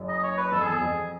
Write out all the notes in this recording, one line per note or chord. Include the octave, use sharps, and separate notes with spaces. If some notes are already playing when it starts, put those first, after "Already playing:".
Already playing: F#1 F#2
D#5
C#5
B4
F2 A4
G#4
E2 A4
G#4
F2